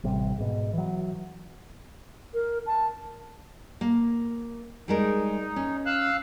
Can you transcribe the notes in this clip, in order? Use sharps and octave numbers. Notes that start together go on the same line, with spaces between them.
A1 C3 G3
G#2 B2
E3 F#3
A#4
A5
A#3
G3 G#3 D#4 A#4
C#4
F5 E6 F#6